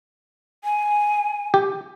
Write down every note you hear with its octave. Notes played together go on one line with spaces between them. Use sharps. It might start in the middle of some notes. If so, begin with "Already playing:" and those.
G#5
G4